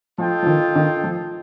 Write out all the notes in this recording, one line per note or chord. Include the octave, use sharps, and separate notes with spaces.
F3 F4 A4 D#5 G5
F3
D#3
D#3
F3